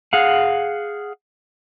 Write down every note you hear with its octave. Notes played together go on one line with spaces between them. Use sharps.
G#4 F5 F#5